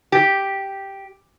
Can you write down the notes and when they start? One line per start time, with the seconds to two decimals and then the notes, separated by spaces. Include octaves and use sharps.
0.12 G4